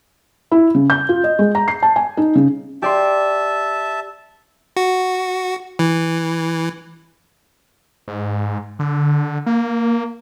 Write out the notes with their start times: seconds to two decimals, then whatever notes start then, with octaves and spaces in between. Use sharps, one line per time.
0.51 E4
0.75 C#3
0.90 G6
1.09 F4
1.24 D#5
1.39 G#3
1.55 A#5
1.68 C7
1.83 A5
1.96 G#5
2.17 D#4
2.35 C#3
2.82 G4 D5 E5 A5 C6
4.76 F#4
5.79 E3
8.08 G#2
8.79 D3
9.46 A#3